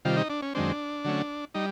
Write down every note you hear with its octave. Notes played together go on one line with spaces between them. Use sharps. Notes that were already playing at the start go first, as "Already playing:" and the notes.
C3 D#3 G3 F4
D#4
D4
C#4
F#2 D#3 G#3 C4 D4
D3 F#3 A3 C#4
G3 D#4